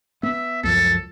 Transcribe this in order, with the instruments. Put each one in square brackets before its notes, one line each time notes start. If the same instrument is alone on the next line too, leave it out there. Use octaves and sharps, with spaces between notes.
[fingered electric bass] B3 [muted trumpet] E5
[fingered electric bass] C#2 F#2 F3 [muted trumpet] A4